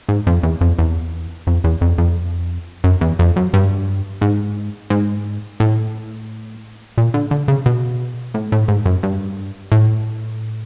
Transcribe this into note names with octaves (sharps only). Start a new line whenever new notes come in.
G#2
F2
E2
F2
E2
F2
E2
F2
F2
F#2
E2
F2
F#2
G2
G#2
G#2
A2
A#2
D3
D3
C#3
B2
A2
A2
G#2
F#2
G2
A2